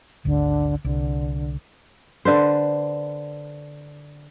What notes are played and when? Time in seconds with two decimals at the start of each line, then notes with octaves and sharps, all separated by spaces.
0.25 G#1 D2 D3
0.85 C2 D3
2.25 D3 B4 C5